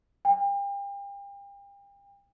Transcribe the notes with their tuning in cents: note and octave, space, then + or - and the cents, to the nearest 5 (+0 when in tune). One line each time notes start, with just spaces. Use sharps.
G5 +35